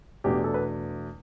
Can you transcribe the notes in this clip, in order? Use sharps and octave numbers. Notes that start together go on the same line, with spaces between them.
E2 B2 A3 D4 G4
A4
B4